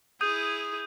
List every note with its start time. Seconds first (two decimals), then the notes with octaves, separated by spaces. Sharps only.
0.21 E4 G#4 D#6 G6 D#7